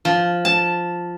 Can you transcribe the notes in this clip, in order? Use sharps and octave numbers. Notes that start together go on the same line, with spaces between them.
F3
A5